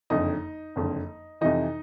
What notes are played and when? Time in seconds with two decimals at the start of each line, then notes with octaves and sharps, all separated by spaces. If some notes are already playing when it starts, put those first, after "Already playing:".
0.10 F#1 F2 D3 D#4 D#5
0.76 F#1 F2 D3
1.41 F2 C3 E3 D#4 D#5